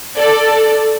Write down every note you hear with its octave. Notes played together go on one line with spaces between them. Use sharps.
A4 D5